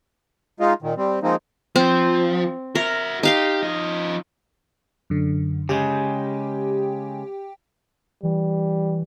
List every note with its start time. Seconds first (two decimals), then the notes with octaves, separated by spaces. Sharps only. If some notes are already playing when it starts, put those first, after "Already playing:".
0.60 G#3 D#4 F4
0.82 A#2 D#3
0.97 G3 C4
1.23 F3 G#3 A#3 C4 D#4
1.76 F3 C4
2.75 F#4 A#4 E5
3.23 D#4 G4 F5 C6
3.63 F3 D#5
5.10 F#2 D3
5.69 C#3 G#3 G4 G5
8.23 E3 G3